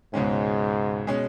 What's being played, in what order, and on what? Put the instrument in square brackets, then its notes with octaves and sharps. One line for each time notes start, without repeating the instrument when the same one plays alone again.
[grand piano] C#2 B2 G#3 C#4 [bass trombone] G#2
[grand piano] B2 G#3 C#4